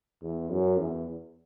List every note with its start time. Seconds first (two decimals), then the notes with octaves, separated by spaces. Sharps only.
0.21 E2
0.50 F#2
0.78 E2